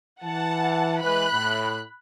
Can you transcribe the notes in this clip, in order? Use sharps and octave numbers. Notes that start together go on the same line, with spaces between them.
E3 F#5 A5
E3 G#3 B4 B5 F#6
A2